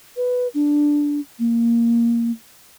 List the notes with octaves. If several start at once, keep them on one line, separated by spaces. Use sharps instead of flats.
B4
D4
A#3